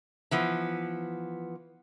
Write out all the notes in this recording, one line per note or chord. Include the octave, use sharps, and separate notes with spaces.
E3 F3 B3